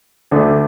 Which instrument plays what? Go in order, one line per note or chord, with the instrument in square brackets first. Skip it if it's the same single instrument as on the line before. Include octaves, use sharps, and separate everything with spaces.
[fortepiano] D2 D3 A3